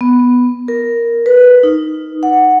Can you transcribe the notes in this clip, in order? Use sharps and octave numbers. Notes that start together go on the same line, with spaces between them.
B3
A#4
B4
D#4
F#5